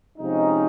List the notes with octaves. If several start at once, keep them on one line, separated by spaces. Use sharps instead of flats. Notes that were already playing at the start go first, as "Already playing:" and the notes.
C3 F3 G#3 C#4 D#4